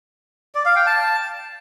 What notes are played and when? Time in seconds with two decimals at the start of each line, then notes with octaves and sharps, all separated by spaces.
0.55 D5
0.65 F5
0.76 G5
0.86 A5